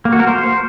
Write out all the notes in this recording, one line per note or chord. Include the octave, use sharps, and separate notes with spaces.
A#3
F#4
A#4
C5